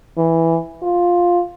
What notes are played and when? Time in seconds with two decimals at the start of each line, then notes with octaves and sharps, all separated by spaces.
0.17 E3
0.83 F4